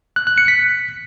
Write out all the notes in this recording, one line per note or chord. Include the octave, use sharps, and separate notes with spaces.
F#6
F#6
C#7
B6